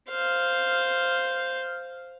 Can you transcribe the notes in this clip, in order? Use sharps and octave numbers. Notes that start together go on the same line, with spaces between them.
C5 F5